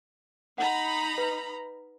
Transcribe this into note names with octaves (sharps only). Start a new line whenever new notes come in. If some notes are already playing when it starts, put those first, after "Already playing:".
D#4 F#5 A#5 B5
B4